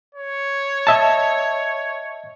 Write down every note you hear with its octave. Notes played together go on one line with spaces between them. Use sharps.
C#5
D#5 E5 A5